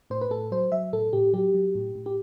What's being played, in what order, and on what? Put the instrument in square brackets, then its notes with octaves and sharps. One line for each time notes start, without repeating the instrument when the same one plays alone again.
[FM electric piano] A2 C5
B4
A2 A4
F#3 C5
F#3 E5
A2 A4
A2 G4
F#3 G4
F#3
A2
A2
G4